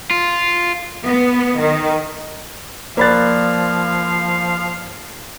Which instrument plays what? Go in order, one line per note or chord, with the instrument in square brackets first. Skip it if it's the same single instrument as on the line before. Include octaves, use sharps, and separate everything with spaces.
[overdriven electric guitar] F4
[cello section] B3
D#3
[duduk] F3 [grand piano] A#3 B5 A6 [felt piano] C5 D5 F#6 [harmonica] F5